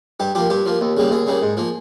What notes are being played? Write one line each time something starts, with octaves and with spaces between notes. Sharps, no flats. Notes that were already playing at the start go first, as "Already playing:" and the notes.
G2 G4
F3 A#3 G4
G2 G4
F3 A#3
D#2
C#3 G3 A#3
D#2 G#4
C#3 G3 A#3
G#2
F3 A#3